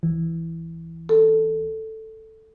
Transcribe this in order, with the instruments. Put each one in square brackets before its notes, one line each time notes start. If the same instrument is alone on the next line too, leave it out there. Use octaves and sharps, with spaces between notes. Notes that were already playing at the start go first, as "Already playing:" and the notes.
[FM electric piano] C#2 E3
[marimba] A4